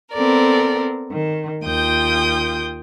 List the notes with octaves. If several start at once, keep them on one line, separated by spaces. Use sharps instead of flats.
B3 C4 A4 A#4 D5
D#3
D#2 F4 G5 D#6 G6